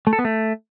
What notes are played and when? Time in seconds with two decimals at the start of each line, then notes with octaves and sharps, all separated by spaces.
0.07 A3
0.13 A4
0.19 B3
0.25 A3